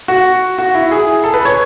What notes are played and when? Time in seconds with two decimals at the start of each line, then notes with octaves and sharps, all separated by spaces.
0.08 F#4
0.59 F#4
0.74 E4
0.91 G#4
1.24 A4
1.34 B4
1.45 C#5